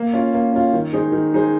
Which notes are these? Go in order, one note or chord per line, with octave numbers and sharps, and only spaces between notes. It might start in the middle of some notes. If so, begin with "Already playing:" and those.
Already playing: A#3
C#4 F4
A#3
C#4 F4
D#3
G#3 D#4 G#4 C5
D#3
G#3 D#4 G#4 C5